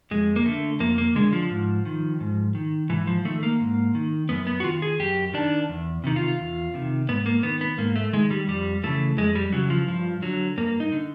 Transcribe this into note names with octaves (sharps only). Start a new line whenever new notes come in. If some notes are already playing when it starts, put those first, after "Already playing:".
F2 G#3
A#3
D3 A3
F2 A#3
A#3
D3 G#3
F3
G#2
D#3
G#2
D#3
G#2 E3
F3
D#3 A3
A#3
G#2
D#3
F#2 B3
B3
F#4
D#3 F4
G#4
F#2 G4
D#3 D4
E2
C3 D#3
F4
E2
C3 D#3
G#2 B3
A#3
D#3 B3
B3
G#2 A#3
A3
D#3 G#3
G3
F2 G3
C#3 E3 A3
F2 G#3
G3
C#3 E3 F#3
F3
G2 F3
D3 F#3
G2 A#3
D#4
D3